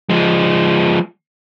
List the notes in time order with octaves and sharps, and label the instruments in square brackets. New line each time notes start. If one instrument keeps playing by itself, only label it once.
[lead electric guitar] F3 G#3